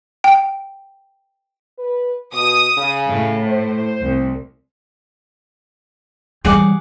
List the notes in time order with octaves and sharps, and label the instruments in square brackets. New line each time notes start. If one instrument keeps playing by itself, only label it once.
[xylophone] G5
[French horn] B4
[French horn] B2 [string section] D#6
[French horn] C#3
[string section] A2
[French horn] C5
[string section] C2
[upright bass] E3 G3 [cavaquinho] G#4 F#5 D6